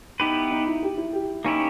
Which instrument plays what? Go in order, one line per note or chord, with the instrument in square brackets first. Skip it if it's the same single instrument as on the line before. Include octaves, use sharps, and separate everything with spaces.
[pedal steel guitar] B3 E4 G4 B4 [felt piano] D#4
[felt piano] D#4
E4
G4
E4
G4
[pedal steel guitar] A#3 C#4 E4 G4 [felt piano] D#4